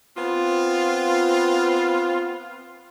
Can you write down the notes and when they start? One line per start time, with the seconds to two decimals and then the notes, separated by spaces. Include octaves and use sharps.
0.16 B3 C4 F4